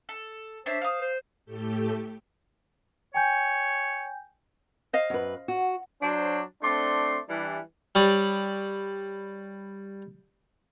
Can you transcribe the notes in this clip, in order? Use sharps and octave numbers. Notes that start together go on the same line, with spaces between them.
A4
D4 C5 C#5 E5
F5 D#6
C5
A2 A3 G4 A4 G6
C#5 G5 G#5 G6
C5 D#5 F5
F#2 B4
F#4
F#3 D4 C5
A3 C4 D4 D5 C6
E3 G3 D4
G3 C#5 D5 D#6